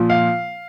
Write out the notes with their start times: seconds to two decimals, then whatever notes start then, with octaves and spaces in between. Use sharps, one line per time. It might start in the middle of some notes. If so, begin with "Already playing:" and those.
Already playing: A#2 F3
0.10 F5